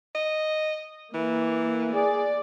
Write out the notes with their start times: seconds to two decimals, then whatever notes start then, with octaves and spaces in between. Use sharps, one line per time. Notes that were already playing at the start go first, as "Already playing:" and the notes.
0.15 D#5
1.14 E3 A#3
1.94 G#4 D5